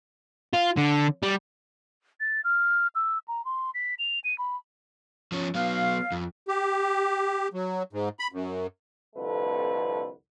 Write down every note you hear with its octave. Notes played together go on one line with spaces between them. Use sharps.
F4
D3
G3
A6
F6
E6
A#5
C6
B6
F7
D#7
B5
F3 C#4
F#3 B3 F5
F2
G4
F#3
G#2
B5
F#2
C2 F2 D3 A3 B4